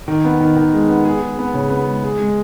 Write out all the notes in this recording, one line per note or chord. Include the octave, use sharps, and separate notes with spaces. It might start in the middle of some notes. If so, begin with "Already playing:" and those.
D#3
B3
D#3
D#3
G#3
B3
G#4
G#4
B3
C#3
B3
G#3
G#4
G#3